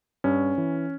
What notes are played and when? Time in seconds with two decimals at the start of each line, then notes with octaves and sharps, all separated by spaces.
0.24 G2 C#4
0.58 E3